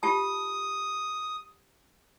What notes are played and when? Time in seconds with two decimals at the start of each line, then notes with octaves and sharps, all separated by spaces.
0.03 F4 G4 A5 D#6